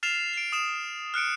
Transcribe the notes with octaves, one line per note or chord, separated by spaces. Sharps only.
F6 A6 C7 E7 F7
C7 D7
D#6 E7
F6 F#6 C#7 D7